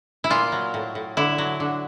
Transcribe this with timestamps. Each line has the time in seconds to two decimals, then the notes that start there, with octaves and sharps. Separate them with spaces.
0.24 E4
0.30 A#2 F4
0.52 F#3
0.74 A2
0.95 A2
1.17 D3 E4
1.38 F#3
1.60 D3